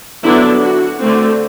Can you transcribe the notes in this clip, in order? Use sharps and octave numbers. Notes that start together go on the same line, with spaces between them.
D3 F#3 B3 D4 E4
F#4
D3 A3 C4